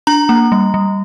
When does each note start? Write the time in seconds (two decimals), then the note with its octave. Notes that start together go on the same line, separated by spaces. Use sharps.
0.07 D4 A#5
0.29 A#3
0.52 G3
0.74 G3